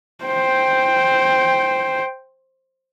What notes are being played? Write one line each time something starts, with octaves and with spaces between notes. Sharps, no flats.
C5 G5